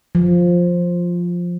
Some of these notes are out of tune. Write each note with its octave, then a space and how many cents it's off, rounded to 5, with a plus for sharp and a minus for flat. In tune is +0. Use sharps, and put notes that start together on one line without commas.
F3 +5